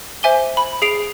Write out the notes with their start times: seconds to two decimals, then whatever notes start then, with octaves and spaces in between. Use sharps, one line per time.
0.23 C5 E5 G#5 D6 G7
0.57 B5
0.82 G#4 C7 D7 F7